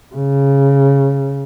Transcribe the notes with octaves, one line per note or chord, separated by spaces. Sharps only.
C#3